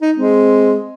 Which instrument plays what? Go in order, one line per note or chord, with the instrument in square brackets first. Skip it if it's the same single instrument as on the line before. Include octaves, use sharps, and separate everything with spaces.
[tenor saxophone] D#4
[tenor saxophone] G#3 [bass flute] C4